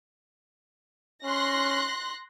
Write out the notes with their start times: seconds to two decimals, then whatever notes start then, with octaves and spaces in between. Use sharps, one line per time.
1.24 C#4 C6 F#6 A#6